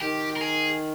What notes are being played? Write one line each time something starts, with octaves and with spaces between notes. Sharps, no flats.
D#3 G4
A#4
G#4